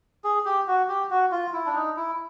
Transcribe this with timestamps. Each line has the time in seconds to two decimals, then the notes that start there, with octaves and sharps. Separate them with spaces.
0.24 G#4
0.45 G4
0.67 F#4
0.88 G4
1.10 F#4
1.32 F4
1.53 E4
1.66 D4
1.75 D#4
1.96 E4